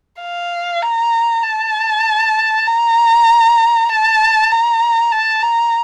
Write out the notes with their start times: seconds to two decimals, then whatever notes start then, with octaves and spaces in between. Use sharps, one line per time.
0.22 F5
0.83 A#5
1.43 A5
2.66 A#5
3.90 A5
4.51 A#5
5.12 A5
5.43 A#5